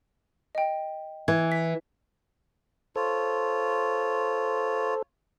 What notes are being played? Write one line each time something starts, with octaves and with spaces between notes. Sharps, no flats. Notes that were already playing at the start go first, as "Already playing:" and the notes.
D#5 G5
E3 G#6
B6
F4 A4 C5 C#5